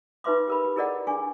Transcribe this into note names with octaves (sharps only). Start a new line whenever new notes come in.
D#4 F4 B4 E5 C6 D6
G4 A#4 B5
G4
E4 G#4 A#4 D5 D#5 F#5
D4 G#4 G#5 C#6